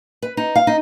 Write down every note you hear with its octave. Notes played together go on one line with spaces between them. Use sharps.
B4
D#4
F5
D#4